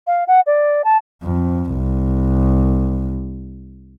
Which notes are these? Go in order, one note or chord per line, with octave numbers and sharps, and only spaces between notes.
F5
F#5
D5
A5
F2
C2